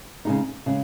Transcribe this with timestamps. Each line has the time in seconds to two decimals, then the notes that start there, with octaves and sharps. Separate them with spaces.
0.25 C#3 G#3 D#4
0.66 C#3 G#3